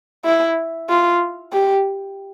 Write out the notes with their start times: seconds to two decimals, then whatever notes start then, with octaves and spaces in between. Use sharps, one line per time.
0.25 E4
0.89 F4
1.53 G4